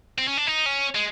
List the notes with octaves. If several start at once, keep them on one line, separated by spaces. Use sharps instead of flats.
C4
C#4
D4
D#4
C#4
G#3